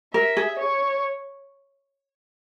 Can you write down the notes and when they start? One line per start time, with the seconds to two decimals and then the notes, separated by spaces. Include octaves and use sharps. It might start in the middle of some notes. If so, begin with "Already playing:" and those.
0.14 A#4 E5
0.37 G#4
0.59 C#5